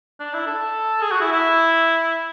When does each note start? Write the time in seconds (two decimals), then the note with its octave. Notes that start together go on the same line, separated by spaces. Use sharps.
0.20 D4
0.34 E4
0.46 A4
1.01 G#4
1.12 F#4
1.21 E4
1.32 E4